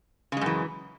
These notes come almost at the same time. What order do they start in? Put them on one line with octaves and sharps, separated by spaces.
C#3 G#3 F#2 E3